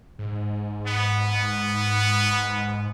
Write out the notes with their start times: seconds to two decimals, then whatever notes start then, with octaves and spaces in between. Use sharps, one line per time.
0.19 G#2
0.86 B3